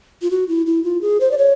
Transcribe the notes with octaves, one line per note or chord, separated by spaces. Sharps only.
F4
F#4
E4
E4
F4
G#4
C5
D5
C#5